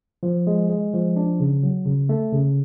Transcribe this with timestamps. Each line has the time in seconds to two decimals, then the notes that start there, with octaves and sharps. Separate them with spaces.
0.23 F3
0.47 G#3
0.70 G#3
0.93 F3
1.16 D4
1.40 C#3
1.63 F#3
1.85 C#3
2.09 A3
2.32 C#3